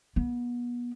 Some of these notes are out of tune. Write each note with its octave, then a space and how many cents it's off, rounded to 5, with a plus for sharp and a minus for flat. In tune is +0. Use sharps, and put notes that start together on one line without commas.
B3 -30